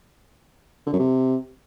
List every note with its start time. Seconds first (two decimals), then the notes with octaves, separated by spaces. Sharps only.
0.87 D3
0.93 F#2
0.99 C3